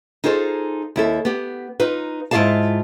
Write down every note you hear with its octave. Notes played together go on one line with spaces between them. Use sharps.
D#4 F4 G#4 A4 C5
D#2 E4 A4
B3 G4
D#4 F4 B4
G#2 E4 F4 G#4 F5 A5